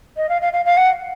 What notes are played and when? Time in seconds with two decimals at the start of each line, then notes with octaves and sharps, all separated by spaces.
0.17 D#5
0.29 F5
0.42 F5
0.53 F5
0.65 F5
0.77 F#5